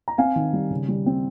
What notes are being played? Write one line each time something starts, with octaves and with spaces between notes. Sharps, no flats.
A#5
C4 F5 G#5
D#3
G3
C#3
G3
C4